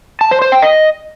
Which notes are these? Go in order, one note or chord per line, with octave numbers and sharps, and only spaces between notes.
A5
C5
C5
G5
D#5